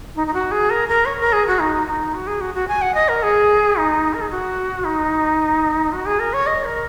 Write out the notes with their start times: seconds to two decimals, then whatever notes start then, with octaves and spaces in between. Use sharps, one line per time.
0.15 D#4
0.27 D#4
0.34 F#4
0.51 G#4
0.70 A#4
0.88 A#4
1.05 C#5
1.20 A#4
1.33 G#4
1.47 F#4
1.59 D#4
1.87 D#4
2.14 F#4
2.27 G#4
2.41 F#4
2.55 F#4
2.68 G#5
2.82 F#5
2.95 D#5
3.09 A#4
3.23 G#4
3.77 D#4
4.14 A#4
4.21 G#4
4.31 F#4
4.84 D#4
5.92 F#4
6.06 G#4
6.19 A#4
6.33 C#5
6.46 D#5
6.64 A#4